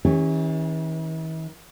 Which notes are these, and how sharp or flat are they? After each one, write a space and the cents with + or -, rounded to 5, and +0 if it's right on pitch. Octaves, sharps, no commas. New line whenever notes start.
E3 -45 C#4 -20 G4 +35